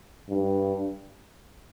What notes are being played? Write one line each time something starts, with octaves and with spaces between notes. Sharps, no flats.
G2